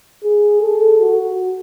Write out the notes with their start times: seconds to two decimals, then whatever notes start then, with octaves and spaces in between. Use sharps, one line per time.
0.24 G#4
0.61 A4
0.99 F#4